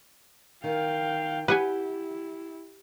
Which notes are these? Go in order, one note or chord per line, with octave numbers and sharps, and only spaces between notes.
D#3 F5 G5
E4 G4 B4 F#5 G#5